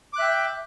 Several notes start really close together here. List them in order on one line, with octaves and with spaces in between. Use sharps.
D6 F#6 E5 G5